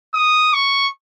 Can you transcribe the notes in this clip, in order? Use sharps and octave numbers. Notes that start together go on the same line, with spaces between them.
D#6
C#6